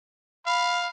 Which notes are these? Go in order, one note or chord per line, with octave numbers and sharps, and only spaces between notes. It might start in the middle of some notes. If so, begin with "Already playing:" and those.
F5 B5